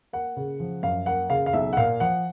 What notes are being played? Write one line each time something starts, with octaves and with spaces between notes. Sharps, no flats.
A#3 F#5
C#3
F3
F#2 F5
A#3 F#5
C#3 F5
F5
B1 E5
F#5
A#2 F5
F3 F#5